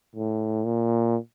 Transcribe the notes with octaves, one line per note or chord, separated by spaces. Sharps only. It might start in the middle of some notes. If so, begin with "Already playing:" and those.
A2
A#2